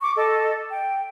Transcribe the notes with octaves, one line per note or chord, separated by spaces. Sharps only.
C#6 D6
A4 D#5
G5